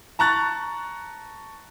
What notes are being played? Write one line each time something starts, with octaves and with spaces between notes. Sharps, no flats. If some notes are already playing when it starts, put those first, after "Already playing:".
A5 A#5 C#6 F#6 A6